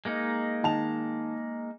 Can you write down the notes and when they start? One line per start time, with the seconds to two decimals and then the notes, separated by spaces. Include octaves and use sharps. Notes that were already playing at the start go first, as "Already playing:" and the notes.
0.05 G#3 A#3 D#4
0.63 D#3 A5 F7